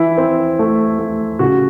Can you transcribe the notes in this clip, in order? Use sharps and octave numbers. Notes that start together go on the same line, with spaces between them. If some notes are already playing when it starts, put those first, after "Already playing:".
Already playing: E3 E4
C4
A3
A3
C#3 F#4